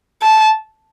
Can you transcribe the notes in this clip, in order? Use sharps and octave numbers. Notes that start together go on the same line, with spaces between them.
A5